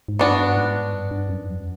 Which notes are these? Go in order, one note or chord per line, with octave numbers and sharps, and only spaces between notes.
G#2
G2 B3 D4 F#4
G#2
G2
G2
F#2
F2